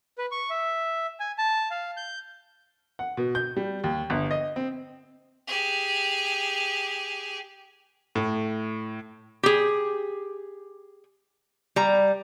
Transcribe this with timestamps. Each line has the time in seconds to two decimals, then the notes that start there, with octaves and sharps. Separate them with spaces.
0.18 B4
0.31 C#6
0.50 E5
1.20 G#5
1.38 A5
1.71 F5
1.97 G6
2.99 F#5
3.17 B2
3.35 G6
3.57 G3
3.84 D#2
4.10 G1
4.31 D#5
4.56 C4
5.48 G4 G#4
8.15 A2
9.43 G4 G#4
11.76 G3 A#5